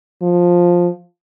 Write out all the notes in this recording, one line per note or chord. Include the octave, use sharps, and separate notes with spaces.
F3